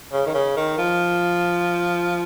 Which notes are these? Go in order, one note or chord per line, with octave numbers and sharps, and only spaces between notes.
C#3
D#3
C#3
D#3
F3